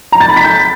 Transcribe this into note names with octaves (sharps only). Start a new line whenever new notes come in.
A#5
A6
B5
B6
G6